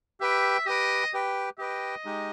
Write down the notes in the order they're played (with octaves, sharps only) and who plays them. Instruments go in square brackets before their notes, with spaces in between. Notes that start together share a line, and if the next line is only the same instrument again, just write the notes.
[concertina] G4 B4 G5 [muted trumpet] E5
[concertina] G4 B4 G5 [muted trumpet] D#5
[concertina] G4 B4 G5
[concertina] G4 B4 G5 [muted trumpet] D#5
[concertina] G#3 D#4 G4